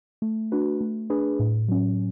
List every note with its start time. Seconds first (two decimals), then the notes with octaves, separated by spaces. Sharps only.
0.22 A3
0.52 D4 F#4 B4
0.81 A3
1.10 D4 G#4 B4
1.39 A2
1.68 F#3 C#4